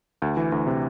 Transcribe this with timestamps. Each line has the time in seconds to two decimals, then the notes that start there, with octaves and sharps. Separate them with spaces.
0.22 D2
0.37 E3
0.52 D2
0.67 C3